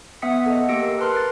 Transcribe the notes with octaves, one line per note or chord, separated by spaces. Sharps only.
B3 E5 F#5 D#6 B6 C#7
A4 D#5
A#3 G4 E6 A#6 C#7 D7
A#4
A#4 B4 A5 C6 F6 F#6
A6